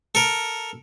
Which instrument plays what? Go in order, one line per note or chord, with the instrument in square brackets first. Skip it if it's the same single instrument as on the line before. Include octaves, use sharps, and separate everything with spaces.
[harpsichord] A4 A#4